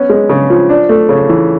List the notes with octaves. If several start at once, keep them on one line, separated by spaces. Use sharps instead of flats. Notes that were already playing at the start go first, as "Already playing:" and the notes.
Already playing: B3 C#4
G#3
C#3
F3
D4
A3
C#3
E3